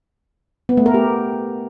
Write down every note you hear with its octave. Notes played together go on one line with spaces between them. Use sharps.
B3
A3
A#4
G4